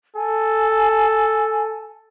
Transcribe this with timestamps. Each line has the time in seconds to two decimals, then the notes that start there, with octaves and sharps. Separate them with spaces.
0.16 A4 G#5